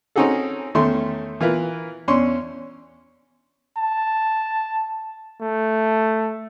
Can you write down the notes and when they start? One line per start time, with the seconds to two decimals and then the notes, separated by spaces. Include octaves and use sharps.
0.16 C4 C#4 D#4 F#4 G#4 A4
0.75 E2 D#3 A3 C#4 E5 C6
1.41 E3 F4 A#4 B4
2.08 E2 C#4 D4 C#5 C6 C#6
3.77 A5
5.41 A3